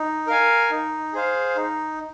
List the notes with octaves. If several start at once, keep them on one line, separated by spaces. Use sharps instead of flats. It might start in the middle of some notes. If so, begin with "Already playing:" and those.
Already playing: D#4
A#4 F5 G#5
D#4
G#4 C5 F5
D#4